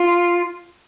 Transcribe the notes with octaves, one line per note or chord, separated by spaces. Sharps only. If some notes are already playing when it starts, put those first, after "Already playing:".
Already playing: F4